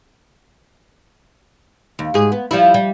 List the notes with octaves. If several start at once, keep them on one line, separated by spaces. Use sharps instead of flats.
D#2
G#2 G#4
B3
F3 G3 E4
G3